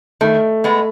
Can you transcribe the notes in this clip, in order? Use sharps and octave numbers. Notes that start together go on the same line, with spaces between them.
D#3 A3
G#3 B3